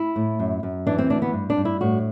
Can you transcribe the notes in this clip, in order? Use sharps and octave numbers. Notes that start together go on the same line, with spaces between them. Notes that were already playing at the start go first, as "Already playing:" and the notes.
Already playing: E4
A2
F#2
F#2
E3 D4
C4
D2 D4
B3
G2
D4
G2
E4
A2 F#4